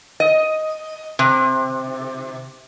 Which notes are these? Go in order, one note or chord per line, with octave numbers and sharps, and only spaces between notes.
D#5
C3